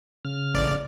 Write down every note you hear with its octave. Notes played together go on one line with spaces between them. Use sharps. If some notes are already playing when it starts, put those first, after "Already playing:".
C#3 F6
A1 D5